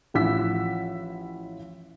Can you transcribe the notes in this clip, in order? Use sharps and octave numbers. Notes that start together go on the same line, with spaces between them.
A1 F3 E4 F#5 E6 B6